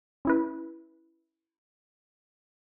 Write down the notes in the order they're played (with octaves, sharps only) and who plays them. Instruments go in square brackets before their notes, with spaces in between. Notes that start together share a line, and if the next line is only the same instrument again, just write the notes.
[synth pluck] C#4 E4 B4